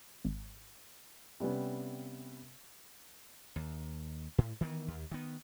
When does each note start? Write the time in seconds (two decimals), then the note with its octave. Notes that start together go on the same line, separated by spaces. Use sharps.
0.25 G#1
1.40 C3 G3 B3 C#4
3.56 D#2
4.38 A2
4.61 D#3 E3 A3 B3
4.88 D#2
5.11 D#3 B3